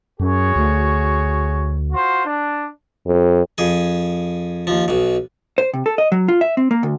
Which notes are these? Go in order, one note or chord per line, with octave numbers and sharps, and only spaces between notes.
F#2 F#4 G#4 C#5
D2
F4 F#4 C5
D4
F2
F2 G#4
D#2 F3
B1 B2
C5
C3
A4
D#5
F#3
F4
E5
C4
A#3
D2